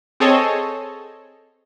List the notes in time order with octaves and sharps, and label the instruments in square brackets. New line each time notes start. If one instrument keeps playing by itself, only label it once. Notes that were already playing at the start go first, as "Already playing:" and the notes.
[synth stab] C4 G#4 A4 C#5 D#5